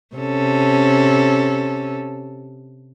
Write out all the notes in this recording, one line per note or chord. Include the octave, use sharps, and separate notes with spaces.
C3 C#4 A4